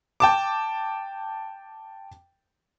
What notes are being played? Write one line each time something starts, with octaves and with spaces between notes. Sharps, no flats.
G5 A5 D6